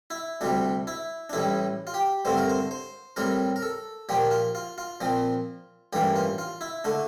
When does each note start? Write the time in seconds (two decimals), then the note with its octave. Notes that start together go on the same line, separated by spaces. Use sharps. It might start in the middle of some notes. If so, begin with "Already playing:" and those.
0.10 E4
0.41 D2 C3 G3 D4
0.87 E4
1.30 D4
1.33 A1 A2 G3 E4
1.87 F4
1.94 G4
2.25 G2 D3 A3 C4 C5
2.38 A#4
2.50 C5
2.71 C5
3.16 A2 G3 C4 A#4
3.56 A#4
3.62 A4
4.09 A#2 F3 A#3 G4
4.31 F4
4.55 F4
4.78 F4
5.01 A#2 F3 C4
5.93 A1 G2 E3 A#3 G4
6.16 F4
6.38 F4
6.61 E4
6.84 D3 A3 D4